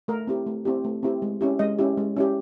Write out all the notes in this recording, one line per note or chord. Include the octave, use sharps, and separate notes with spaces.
A3 A#4
C4 E4 G4
A3
C4 E4 G4
A3
C4 E4 G4
G#3
C#4 E4 G4
G#3 D#5
C#4 E4 G4
G#3
C#4 E4 G4